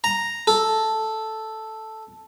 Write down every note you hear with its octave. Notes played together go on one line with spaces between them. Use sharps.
A#5
A4